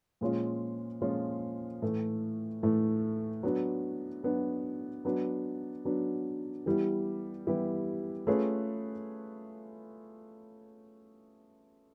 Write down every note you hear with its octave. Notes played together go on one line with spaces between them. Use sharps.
A#2 F3 G#3 C#4 F4
A#2 F3 G#3 C#4 F4
A2 E3 A3
A2 E3 A3
F#3 B3 D4 F#4
F#3 B3 D4 F#4
F#3 B3 D4 F#4
F#3 B3 D4 F#4
E3 G3 B3 E4 G4
E3 G3 B3 E4 G4
A3 C#4 F4 G#4 B4